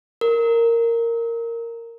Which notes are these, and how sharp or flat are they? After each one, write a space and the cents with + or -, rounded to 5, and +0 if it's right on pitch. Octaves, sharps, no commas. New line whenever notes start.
A#4 -10